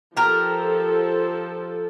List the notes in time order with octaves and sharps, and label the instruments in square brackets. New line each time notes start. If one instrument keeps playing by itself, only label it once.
[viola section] F3 A4 [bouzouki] G4 A#4